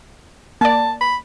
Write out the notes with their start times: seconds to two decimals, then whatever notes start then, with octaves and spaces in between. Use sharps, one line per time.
0.61 A#3 D5 A5
1.01 B5